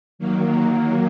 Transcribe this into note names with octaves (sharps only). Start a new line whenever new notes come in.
D#3 F#3 A#3